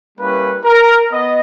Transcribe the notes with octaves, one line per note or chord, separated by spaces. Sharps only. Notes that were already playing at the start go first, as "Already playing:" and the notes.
G3 A#3 C#4 E4 G4 B4
A#4
B3 D#5